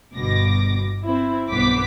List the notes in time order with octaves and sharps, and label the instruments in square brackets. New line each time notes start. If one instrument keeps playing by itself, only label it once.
[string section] G1 G2 B2 D6 A#6
C4 E4
B1 G2 B3 C5 D6 B6